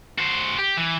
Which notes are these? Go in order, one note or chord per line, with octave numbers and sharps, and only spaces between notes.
F#4 C5
G4
E3